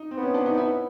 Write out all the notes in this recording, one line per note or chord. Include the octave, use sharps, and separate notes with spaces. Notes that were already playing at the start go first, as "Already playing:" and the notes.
Already playing: D#4
C4
B3
C#4
D4
D#4
E4